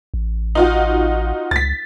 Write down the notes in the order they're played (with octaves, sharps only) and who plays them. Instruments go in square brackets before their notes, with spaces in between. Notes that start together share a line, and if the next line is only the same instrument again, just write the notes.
[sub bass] A1
[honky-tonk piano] D#4 F4 F#4
[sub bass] C#2 [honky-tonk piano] A6 B6